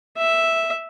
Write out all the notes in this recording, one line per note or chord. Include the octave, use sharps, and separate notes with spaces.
E5